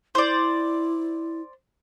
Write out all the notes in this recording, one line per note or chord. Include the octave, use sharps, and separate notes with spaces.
E4 C5 D5